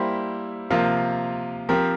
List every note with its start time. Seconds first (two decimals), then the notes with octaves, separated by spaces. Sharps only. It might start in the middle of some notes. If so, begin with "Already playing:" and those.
Already playing: G3 A#3 E4 G4 C5
0.70 C3 F3 A#3 F4
1.69 F3 C4 G4 A#4